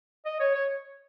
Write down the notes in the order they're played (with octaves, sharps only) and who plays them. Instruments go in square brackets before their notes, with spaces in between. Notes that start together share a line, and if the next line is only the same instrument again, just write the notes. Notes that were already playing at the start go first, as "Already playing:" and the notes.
[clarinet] D#5
C#5
C#5